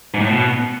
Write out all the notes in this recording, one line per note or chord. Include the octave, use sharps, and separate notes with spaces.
G#2
A2
B2